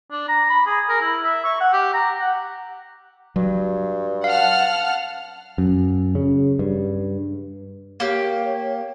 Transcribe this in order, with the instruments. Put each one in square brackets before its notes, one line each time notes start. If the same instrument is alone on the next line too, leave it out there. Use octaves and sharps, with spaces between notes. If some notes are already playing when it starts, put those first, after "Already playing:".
[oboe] D4
A#5
B5
G#4
A#4
E4
E5
C#6
F#5
G4
A#5
F#5
[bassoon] G2 [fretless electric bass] F#3
[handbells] F5 [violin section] F#5 A5 F6
[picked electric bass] F#2
C#3
G2
[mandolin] A#3 G4 [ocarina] C#5